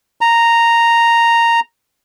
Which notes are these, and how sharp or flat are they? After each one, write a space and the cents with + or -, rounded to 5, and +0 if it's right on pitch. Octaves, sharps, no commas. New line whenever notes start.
A#5 -5